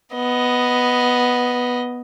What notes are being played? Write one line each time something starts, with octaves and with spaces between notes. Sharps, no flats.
B3 D#5